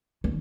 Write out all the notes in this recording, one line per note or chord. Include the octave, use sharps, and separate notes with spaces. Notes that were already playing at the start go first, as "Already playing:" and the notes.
D#3